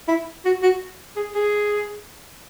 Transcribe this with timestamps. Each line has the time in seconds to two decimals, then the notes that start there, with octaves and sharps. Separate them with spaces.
0.08 E4
0.45 F#4
0.63 F#4
1.17 G#4
1.35 G#4